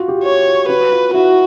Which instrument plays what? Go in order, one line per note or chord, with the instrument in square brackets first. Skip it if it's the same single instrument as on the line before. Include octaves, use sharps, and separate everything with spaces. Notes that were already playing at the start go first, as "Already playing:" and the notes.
Already playing: [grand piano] F4 F#4
G4
[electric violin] C#5
[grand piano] F#4 [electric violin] B4
[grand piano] F4
[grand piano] E4 [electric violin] F#4